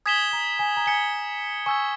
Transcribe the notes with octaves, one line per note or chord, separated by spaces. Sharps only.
G#5 D#6 G#6 B6 E7 G7
A#5
G#5
A#5
G#5 G#6 C#7 G7
G#5 C#6 E6 G#6